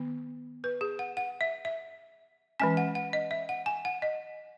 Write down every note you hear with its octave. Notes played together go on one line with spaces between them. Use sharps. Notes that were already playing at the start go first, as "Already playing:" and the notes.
Already playing: D#3 B3
B4
G#4
F#5
F#5
E5
E5
E3 G#3 C#4 G#5
F#5
F#5
D#5
E5
F#5
G#5
F#5
D#5